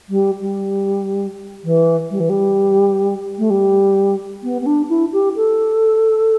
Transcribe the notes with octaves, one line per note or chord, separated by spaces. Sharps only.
G3
G3
E3
G3
E3
G3
A3
G3
B3
B3
D4
E4
G4
A4